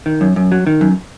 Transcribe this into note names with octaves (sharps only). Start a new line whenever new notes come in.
D#3
F#2
F#2
F#3
D#3
F#2